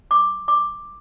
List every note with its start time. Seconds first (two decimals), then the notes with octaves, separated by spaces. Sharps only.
0.11 D6
0.48 D6